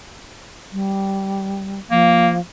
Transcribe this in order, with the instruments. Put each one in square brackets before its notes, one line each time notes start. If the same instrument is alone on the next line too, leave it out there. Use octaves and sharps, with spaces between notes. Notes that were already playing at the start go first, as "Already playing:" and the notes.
[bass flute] G3
[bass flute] F3 [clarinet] A#3